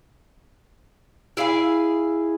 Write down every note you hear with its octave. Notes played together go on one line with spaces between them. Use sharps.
E4 G#4 F5 G#5